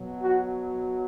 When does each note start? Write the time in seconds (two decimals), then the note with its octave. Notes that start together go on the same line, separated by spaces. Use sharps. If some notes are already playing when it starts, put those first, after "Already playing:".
Already playing: B2 F#3
0.23 F#4